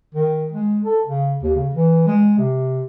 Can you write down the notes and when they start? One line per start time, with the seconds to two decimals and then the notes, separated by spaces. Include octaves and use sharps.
0.14 D#3
0.52 G#3
0.85 A4
1.06 C#3
1.43 D#2
1.56 C#3
1.73 E3
2.07 G#3
2.38 C3